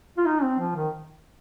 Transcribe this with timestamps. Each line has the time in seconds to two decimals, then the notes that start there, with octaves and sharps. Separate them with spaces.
0.18 F4
0.26 D#4
0.43 C4
0.59 F3
0.75 D#3